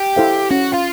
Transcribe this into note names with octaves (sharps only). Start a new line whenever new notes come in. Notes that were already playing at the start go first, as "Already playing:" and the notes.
Already playing: G4
E4 A4 C5 F5
C#4 F#4
F4